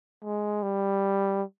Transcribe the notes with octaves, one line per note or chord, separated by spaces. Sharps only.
G#3
G3